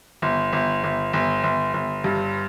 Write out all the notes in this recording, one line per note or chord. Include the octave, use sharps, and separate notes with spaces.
G1
G1
G1
G1
G1
G1
G2